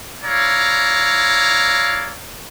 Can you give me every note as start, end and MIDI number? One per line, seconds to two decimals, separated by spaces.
0.25 2.15 64
0.25 2.15 73
0.25 2.15 74
0.25 2.15 77
0.25 2.15 82